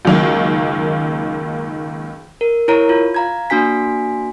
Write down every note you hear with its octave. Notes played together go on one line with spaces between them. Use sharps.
C#2 F#2 D#3 A#3
A#4
E4 A#4 C#5 A#5
F4
F5 A#5 G#6
A#3 D4 F#4 G#5 B6